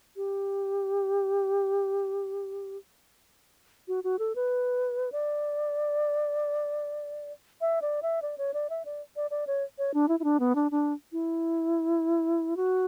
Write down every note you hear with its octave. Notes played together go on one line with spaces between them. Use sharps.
G4
F#4
F#4
A4
B4
D5
E5
D5
E5
D5
C#5
D5
E5
D5
D5
D5
C#5
C#5
D4
E4
E4
D4
B3
D4
D4
E4
F#4